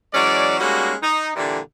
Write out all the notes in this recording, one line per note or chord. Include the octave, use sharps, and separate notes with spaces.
E3 F#3 G#3 C#4 D5
G3 G#3 A#3 C#4 D#4 F#4
D#4
A#2 D3 E3 G3